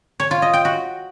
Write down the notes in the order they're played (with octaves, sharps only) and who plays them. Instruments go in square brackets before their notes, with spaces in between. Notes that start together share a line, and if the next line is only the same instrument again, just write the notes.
[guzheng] C#5
F4
D#5
G5
F#4